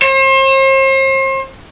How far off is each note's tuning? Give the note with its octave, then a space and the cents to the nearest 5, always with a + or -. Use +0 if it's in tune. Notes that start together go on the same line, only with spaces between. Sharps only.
C5 +40